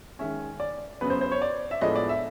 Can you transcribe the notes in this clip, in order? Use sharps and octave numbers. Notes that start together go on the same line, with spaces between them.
D#3 G#3 C#4 E5
D5
F#2 C#3 F#3 B3 B4
C5
C5
C#5
D5
E5
A2 F3 G#3 B3 D4 D#5
D5
E5